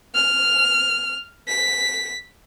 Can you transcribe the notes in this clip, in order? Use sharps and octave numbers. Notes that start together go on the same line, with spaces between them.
F6
B6